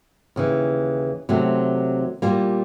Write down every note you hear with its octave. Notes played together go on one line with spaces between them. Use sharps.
D#2 C#3 E3
C3 D#3 F#3 A3 C4
A#2 G3 A#3